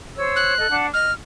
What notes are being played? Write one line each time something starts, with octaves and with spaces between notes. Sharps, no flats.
C5 C#5 E6
F#6
A4 D#5
D4 F#5 A5
D#5 F6